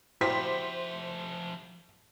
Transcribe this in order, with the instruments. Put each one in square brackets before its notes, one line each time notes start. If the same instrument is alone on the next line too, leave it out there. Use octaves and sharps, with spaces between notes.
[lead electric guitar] F3 E5 [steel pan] E4 F#4 G4 [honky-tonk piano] C5 [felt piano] B6